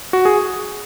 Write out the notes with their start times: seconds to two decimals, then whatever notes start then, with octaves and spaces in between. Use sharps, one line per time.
0.13 F#4
0.25 G#4